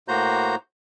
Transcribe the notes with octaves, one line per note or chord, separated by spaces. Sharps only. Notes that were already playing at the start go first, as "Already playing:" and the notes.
A2 A#3 F#4 C5 A#5 G6